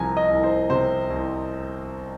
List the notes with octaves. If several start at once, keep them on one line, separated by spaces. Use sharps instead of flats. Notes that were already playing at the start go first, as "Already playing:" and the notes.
Already playing: C2 C3 F3 G#5 A#5
D#5
C2
C5
C3 C5
C2